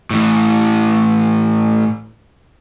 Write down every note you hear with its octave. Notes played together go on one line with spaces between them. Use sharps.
A2 E3